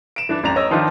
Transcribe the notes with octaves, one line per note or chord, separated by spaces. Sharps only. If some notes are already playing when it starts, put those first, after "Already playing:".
D7 E7
E3 D4
A1 F2 D5 A#5 F7
C#5 D#5 E6
D#3 F3 D4 D#4 F4